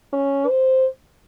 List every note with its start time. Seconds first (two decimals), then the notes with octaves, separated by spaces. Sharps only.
0.13 C#4
0.48 C5